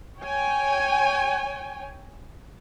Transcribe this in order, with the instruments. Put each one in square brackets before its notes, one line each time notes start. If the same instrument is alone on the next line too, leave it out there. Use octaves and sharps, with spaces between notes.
[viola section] C#5 G5 G#5